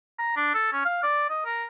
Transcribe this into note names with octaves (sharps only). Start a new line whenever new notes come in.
A#5
D4
A4
C#4
F5
D5
D#5
A#4